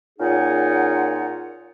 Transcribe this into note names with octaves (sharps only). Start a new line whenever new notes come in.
A#2 C#4 D#4 F4 G#4 F#5